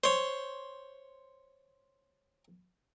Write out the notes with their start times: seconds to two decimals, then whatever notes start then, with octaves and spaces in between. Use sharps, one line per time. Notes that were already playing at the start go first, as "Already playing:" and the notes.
0.04 C5 C#5